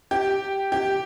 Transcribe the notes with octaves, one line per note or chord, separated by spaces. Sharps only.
G4
G4